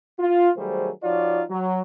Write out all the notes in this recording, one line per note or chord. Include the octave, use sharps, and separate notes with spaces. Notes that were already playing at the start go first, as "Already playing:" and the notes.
F4
D#3 F#3 G3 A3 G#4 C5
F3 D#4 F4 F#4 C#5 D5
F#3